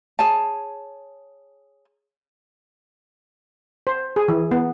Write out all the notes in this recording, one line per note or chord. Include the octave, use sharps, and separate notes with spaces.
G#4 C#5 G#5 A5
C5
G#4
E3
B3